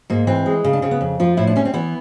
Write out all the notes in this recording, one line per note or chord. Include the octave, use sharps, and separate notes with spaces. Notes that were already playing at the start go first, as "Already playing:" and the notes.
G#2 A#3
E3 C4
G#3
C#3
D4
C#3 C4
B3
F2
F3 F4
A2 E4
D4
G3 C#4
C4
E3 B3